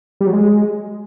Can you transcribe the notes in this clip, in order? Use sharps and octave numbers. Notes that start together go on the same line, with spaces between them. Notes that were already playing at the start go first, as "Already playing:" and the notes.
G3
F#3
G#3